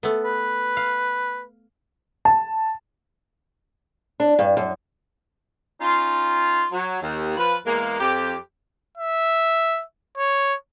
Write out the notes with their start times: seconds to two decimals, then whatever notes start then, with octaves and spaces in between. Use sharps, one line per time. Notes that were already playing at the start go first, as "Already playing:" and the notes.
0.03 A3 B3
0.25 B4
0.77 F5
2.25 A5
4.20 D4
4.39 G2
4.57 F#2
5.81 C#4 D#4 F4
6.72 F#3
7.02 D#2
7.37 F3 B4
7.65 E2 G#3 A#3
7.99 F2 G4
8.97 E5
10.17 C#5